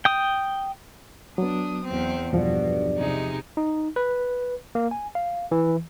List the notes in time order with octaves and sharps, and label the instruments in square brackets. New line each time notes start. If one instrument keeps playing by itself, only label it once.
[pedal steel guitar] G5 D#6
[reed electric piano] F#3 B3 [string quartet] D4 D#6
[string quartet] E2 C4
[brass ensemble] B1 G2 D5 [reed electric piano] E2 F3 [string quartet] B2
[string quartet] C3 G#3 D#4
[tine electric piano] D#4
B4
A#3
G#5
F5
E3